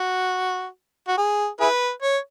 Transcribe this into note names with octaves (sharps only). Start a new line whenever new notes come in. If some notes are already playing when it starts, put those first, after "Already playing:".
Already playing: F#4
F#4
G#4
E4 G#4 B4
C#5